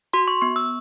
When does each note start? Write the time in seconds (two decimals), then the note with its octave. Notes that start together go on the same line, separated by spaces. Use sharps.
0.13 F#4 C6
0.28 C#6
0.41 B3 C#6
0.56 E6